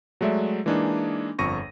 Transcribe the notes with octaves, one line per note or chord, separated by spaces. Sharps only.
F#3 G#3 A3 D5 E5
E3 G#3 A#3 D4 D#4 G#4
G1 F2 C#6 A#6 D#7